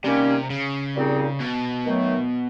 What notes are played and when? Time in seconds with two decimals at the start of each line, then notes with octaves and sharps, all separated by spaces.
0.04 C3 D#3 G3 A#3 C#4
0.50 C#3
0.95 A#2 G3 C4 D#4 G#4
1.40 B2
1.86 D#3 F#3 A3